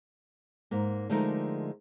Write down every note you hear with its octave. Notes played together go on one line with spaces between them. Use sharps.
G#2 A#3
D3 F3 G#3 A3 D#4 A#4